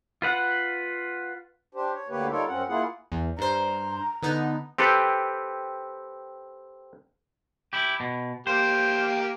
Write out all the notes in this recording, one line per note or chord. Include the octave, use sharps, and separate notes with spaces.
F4 B4 F#5
D4 G4 C5
C#5
D2 D3 A#3 G4 B4 C#5
G3 D#4 F4 A4 A#4 C#5
F#2 C4 C#4 F#5
A#3 E4 F4 G#4 F#5
E2
G2 C5 A#5
D3 B3 D#4
C4 G4 A4 B4
E4 G4
B2
A#3 G4 C5